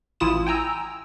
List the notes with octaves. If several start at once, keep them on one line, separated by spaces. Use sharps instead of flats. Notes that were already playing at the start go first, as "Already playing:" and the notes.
A1 E4 F4 D#6 E7
G5 G#5 A#5 E6